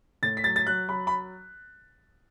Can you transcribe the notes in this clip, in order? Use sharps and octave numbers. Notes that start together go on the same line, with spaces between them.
A2 A6
B6
F#3 A6
A6
F#3 F#6
F#3 B5
B5